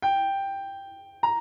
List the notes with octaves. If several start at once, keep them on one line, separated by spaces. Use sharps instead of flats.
G5
A#5